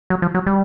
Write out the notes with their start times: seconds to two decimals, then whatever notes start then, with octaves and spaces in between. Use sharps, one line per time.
0.10 F#3
0.22 F3
0.34 F#3
0.47 G3